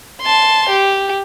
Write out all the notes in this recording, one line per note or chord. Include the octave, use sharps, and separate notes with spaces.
A5 C6
G4